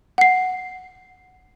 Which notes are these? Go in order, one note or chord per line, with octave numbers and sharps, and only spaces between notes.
F#5 C7